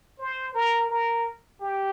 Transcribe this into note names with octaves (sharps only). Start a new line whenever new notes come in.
C5
A#4
A#4
G4